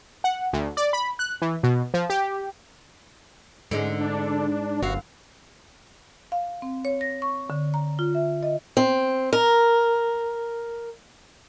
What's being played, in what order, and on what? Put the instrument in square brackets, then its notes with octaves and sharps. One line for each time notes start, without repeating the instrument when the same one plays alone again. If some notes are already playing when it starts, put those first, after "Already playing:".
[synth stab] F#5
D2
D5
B5
F#6
E3
B2
F3
G4
[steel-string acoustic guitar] G#2 [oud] D3 G#3 C#4
[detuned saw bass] D4
[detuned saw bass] G1 [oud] F#2 F5 [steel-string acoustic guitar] F#4
[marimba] F5
C4
C#5
A#6
C#6
D3
A#5
F4
E5
D#5
[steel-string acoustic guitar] C4
A#4